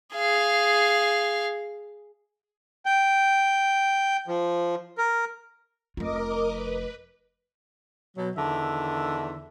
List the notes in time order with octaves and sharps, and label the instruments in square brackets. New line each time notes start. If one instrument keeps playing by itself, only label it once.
[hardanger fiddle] G#4 F5
[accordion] G5
F3
A#4
[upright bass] F1 F4 [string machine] A#4 D#5 D6
[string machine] B4
[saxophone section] B2 F#3
E2 D3 D#3 E5